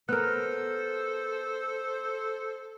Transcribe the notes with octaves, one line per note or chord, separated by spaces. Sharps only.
B3 A4 A#4 C5 F6 F#6